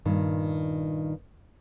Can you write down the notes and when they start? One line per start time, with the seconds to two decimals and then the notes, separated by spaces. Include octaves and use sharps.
0.05 G2 A#2 D#3